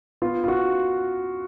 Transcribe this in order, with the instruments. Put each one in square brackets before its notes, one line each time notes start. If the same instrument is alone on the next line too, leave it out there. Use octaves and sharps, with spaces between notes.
[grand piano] B3 F4
F4
F#4